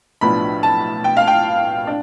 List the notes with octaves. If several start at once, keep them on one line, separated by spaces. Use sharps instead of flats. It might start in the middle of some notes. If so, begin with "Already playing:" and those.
B1 A2 F3 B3 D4 B5
A5
G5
F5
G5
D4